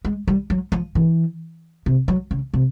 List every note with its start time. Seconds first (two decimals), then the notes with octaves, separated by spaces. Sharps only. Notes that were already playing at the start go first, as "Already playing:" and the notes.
0.05 G#3
0.28 G3
0.50 F#3
0.72 F3
0.95 E3
1.86 C3
2.08 F#3
2.31 C#3
2.54 C3